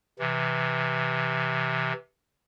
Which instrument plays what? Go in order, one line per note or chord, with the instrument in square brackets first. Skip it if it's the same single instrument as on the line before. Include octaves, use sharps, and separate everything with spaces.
[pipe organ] C3 E3